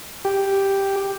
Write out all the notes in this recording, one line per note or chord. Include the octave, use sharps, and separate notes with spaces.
G4